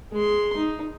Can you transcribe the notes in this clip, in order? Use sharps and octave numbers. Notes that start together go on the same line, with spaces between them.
G#3 C6
D#4